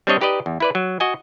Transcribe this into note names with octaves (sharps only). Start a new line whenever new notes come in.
G3 C4 D4 C#5 D#5
D#4 G4 B4 D5 D#5
E2
E4 B4 D5
F#3
F#4 D#5 G#5